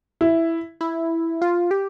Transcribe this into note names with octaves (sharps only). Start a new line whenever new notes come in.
E4
E4
F4
G4